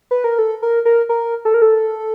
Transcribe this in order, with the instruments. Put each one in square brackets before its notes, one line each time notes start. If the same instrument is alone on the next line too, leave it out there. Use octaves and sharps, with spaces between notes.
[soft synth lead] B4
A#4
A4
A#4
A#4
A#4
A4
A#4
A4